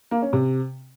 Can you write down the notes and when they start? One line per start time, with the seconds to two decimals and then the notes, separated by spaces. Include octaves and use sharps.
0.11 A#3
0.22 C#4
0.33 C3